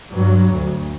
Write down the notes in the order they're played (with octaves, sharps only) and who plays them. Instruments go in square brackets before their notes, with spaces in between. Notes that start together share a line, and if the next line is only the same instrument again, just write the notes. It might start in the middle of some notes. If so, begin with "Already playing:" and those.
[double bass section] G2 F#3
D2